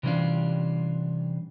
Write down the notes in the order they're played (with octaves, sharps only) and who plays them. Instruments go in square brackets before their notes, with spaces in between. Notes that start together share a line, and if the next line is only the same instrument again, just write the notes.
[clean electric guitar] C3 E3 G3 C#4 D4 F4